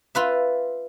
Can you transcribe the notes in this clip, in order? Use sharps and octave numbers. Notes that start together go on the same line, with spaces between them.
F4 B4 E5